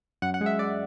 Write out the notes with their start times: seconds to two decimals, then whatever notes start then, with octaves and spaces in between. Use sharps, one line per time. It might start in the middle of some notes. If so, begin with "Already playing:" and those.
0.22 F#2 F#5
0.34 F#5
0.41 G#3
0.46 E5
0.59 G#3 D5